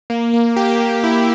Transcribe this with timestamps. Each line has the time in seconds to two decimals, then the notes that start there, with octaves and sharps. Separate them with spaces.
0.10 A#3
0.34 A#3
0.56 G4
0.80 A#3
1.04 E4